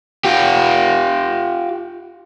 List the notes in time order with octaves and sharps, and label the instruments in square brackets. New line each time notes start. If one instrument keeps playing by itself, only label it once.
[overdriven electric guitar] F4 G4